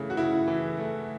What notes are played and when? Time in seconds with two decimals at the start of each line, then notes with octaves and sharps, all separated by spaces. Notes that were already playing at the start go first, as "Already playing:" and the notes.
Already playing: C#3 E3 A3
0.10 F#4
0.17 C#3 E4
0.48 E3
0.79 A3